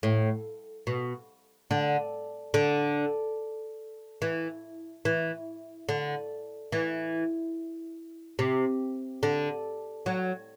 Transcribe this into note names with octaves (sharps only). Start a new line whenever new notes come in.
A2
B2
D3
D3
E3
E3
D3
E3
C3
D3
F#3